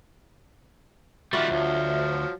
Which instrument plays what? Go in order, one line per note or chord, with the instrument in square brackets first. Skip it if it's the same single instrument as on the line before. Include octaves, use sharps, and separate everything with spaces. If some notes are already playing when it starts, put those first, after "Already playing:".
[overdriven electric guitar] D#3 G3 [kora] F4 F#4 D5 [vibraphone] E5
[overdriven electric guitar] D2 [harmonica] F3 F#3